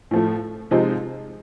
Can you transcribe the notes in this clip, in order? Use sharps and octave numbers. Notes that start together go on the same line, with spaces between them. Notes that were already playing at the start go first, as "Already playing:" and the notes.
A2 F3 A3
C3 F3 G#3 C4 D#4